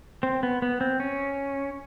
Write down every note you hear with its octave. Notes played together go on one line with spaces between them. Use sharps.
C4
B3
B3
C4
C#4